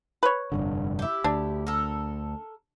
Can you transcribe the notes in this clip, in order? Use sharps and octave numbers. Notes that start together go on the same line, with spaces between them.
B4 C#5
F1 G2 D3
E4 G4
D2 D4
A4 A#4